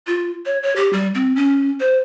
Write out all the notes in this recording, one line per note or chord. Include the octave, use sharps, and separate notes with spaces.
F4
C#5
C#5
G4
G3
C4
C#4
C5